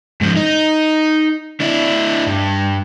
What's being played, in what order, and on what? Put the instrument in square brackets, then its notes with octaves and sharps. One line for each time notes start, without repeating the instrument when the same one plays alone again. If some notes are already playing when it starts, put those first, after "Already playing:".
[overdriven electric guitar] G#2 F3
D#4
D4 E4
G2